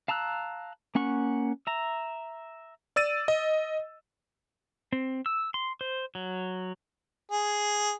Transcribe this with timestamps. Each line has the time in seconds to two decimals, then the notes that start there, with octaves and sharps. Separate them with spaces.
0.08 F5 A5 A#5 E6 F#6
0.95 A#3 C#4 F#5 C#6
1.67 E5 A#5
2.96 D5 E6 A6 D#7
3.28 D#5
4.93 C4
5.26 E6
5.54 C6
5.81 C5
6.15 F#3
7.30 G#4